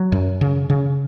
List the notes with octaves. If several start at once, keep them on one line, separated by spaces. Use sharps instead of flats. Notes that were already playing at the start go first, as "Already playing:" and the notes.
Already playing: F#3
F#2
C#3
C#3